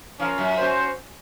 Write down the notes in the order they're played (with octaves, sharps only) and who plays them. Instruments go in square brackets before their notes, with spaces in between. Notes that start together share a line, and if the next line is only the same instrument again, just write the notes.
[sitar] F3 [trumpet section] C#4 F4 A#4 F5
[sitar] F#2
[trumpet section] C#4 F#4 C5